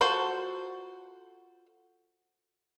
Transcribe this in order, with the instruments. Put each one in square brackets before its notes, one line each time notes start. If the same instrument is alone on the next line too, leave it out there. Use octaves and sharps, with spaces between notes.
[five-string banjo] F4 F#4 A4 C5